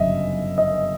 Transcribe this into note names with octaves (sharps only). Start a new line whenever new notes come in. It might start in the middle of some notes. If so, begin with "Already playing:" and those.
Already playing: G1 F#2 C#3 D#5 E5
D#5